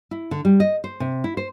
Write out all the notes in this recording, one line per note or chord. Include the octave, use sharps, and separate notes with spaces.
E4
D3
G3
D#5
C5
C3
E4
C5